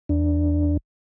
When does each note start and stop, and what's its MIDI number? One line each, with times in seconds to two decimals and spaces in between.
0.09 0.77 40
0.09 0.77 62